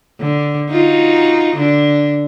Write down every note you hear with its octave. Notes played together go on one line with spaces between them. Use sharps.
D3
D#4 F4 F#4
D3 D4